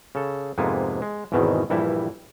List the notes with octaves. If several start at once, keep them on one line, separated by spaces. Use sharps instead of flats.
C#3 A4
F2 G#2 C3 A#3 B3 G#5
G#3
G#1 E2 G#2 B2 D#3 E3
A#1 G2 E3 G3 E4